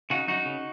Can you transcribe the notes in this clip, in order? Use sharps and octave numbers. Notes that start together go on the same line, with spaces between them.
C#3 D#4 F#4
F#2 D#4 F#4
C#3